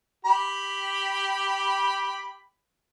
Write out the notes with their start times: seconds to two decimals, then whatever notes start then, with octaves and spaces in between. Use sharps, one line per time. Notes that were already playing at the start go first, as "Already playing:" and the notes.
0.25 G4 B5